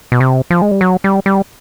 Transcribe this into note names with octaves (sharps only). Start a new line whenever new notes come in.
B2
C3
F3
G#3
G3
F#3
G3
G3